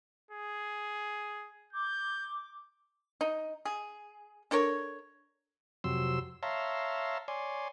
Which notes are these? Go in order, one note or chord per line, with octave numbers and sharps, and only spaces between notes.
G#4
D6 G6
D#4
G#4
D4 A4 A#4 C#5
F2 C3 F#3 C6 E6
C#5 E5 F5 A5 A#5 C6
C#5 D5 G#5 C6